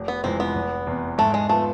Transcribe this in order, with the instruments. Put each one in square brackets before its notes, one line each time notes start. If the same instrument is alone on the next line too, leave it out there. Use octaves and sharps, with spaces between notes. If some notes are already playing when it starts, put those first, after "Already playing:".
Already playing: [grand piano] F1
[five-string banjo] B3
[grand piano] F2 C3 E3 G#3 [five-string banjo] C4
[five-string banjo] B3
[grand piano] F1
E2 C3
[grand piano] G#2 [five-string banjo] A3
[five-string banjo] G#3
[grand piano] F3 B3 [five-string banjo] A3